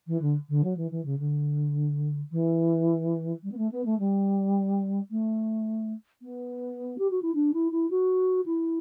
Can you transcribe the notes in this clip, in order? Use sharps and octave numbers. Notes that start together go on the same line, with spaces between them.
E3
D3
D3
F#3
E3
E3
C#3
D3
E3
G3
B3
A3
B3
A3
G3
A3
B3
G4
F#4
E4
D4
E4
E4
F#4
E4